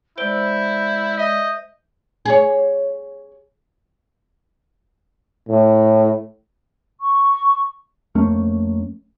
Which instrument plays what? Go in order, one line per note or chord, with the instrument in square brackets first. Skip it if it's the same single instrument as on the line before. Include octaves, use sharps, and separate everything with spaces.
[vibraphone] G#3 D5 E6 [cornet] E4 [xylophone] C5 D7 G7 [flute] G6
[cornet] D#5 [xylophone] E5
[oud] G#4 C#5
[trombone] A2
[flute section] C#6
[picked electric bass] F2 A3 A#3 C#4